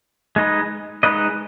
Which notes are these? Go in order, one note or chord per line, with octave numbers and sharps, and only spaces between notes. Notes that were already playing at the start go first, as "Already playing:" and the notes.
G#3 D#4 B4 D#5
G#3 D#4 B4 D#5